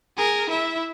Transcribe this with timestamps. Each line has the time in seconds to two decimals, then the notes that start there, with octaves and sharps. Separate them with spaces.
0.17 G#4 A#4
0.50 E4 E5